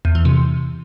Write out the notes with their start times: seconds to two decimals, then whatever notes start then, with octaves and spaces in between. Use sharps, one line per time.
0.05 E2
0.15 E3
0.25 C3